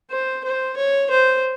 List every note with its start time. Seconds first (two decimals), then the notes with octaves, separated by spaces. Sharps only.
0.11 C5
0.44 C5
0.77 C#5
1.11 C5